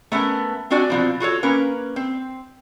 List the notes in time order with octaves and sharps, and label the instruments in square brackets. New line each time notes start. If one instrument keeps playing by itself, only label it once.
[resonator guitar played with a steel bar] A3 B3 C#4 A#4
C4 D4 F#4 D5 G#5
B2 F3 C4
F4 F#4 A4 C#5
A#3 C#4 A#4 B4
C4